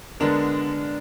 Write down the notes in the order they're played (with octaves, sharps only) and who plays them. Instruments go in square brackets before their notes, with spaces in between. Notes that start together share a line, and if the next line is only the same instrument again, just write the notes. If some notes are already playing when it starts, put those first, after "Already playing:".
[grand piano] D3 G#3 B3 D4 A#4